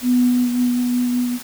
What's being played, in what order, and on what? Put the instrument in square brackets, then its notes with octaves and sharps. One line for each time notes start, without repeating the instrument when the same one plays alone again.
[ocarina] B3